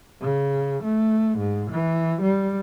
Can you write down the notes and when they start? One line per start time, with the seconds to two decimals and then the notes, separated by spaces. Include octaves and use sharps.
0.21 C#3
0.84 A3
1.38 G#2
1.71 E3
2.22 G3